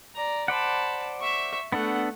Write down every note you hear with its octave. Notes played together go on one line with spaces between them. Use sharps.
D5 A#5
C5 D5 F#5 A5 B5
E5 C#6
A3 B3 D4 A4 F#5